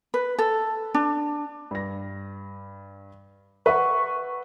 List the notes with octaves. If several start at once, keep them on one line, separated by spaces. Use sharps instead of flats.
B4
A4
D4
G2 A#6
B4 E5 F#5 C#6